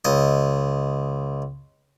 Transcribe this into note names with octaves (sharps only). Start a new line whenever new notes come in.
C#2 D#5